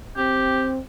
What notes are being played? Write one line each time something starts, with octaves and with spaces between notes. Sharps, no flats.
C4 G4